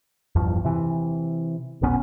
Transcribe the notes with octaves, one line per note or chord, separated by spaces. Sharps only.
E2 G2 F3
C3 E3
F1 B1 B3 C#4